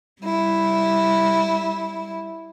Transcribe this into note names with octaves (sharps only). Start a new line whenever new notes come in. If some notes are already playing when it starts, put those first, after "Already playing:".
G3 E4